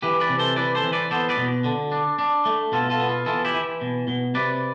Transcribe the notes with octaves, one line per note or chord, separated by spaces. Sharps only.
E3 G4 B4
B4 D5
C3
A4 C5
E3 B4 D5
A4 C5
E3
B4 D5
B3 A4 C5
B4 D5
B2
D3
D4
D4
A3
B2 F4 A4
F4 A4
B3
F4
E3 F4 A4
E4 G4
E3
B2
B2
C3 B4 D5